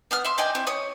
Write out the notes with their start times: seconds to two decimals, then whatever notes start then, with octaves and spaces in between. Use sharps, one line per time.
0.11 B3 D#6 F6
0.25 E5 C6
0.38 D5 D#5 G5 G#5
0.55 C4 E4
0.67 C#5 D#6